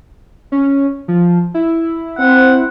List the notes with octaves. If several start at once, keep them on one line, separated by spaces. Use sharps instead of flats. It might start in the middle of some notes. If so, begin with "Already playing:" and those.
C#4
F3
E4
C4 F#5